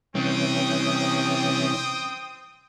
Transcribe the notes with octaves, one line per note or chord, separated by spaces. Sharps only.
C3 E3 G3 C4 C#4 G5 D#6